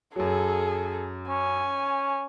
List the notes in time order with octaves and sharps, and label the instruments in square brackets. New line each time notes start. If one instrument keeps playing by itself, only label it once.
[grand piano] F#2 F#3 [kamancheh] G#4 A4
[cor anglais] C#4 [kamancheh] G#5